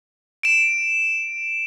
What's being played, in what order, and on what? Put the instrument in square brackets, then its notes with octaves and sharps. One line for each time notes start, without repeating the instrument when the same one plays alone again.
[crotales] D7 E7